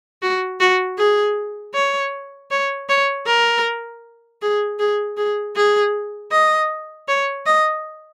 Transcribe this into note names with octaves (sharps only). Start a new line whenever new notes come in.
F#4
F#4
G#4
C#5
C#5
C#5
A#4
G#4
G#4
G#4
G#4
D#5
C#5
D#5